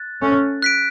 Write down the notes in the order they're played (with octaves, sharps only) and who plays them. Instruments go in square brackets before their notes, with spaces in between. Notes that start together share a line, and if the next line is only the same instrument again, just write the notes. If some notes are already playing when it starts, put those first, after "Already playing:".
Already playing: [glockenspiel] F#6 A6
[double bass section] A3 C#4
[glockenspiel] F#6 B6 D7